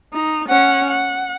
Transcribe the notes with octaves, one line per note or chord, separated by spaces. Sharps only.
D#4
C#4 F#5
F#5